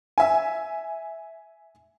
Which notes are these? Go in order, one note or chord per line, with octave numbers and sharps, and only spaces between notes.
E5 G#5